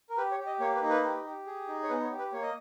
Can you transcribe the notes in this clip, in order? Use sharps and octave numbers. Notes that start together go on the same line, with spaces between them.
A#4
G4 B4
C#5
G4
D#5
A#3 C#5
B4
D#4
B4
G4
G4
G#4
D#4
C#5
B3 B4
C#5
G4
B4
A#3 C#5
D#5